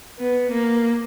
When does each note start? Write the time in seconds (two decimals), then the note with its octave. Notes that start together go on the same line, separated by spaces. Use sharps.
0.19 B3
0.52 A#3